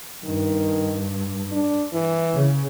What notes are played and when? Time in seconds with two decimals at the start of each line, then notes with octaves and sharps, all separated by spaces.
0.24 G2 D#3
1.51 D4
1.93 E3
2.34 C#3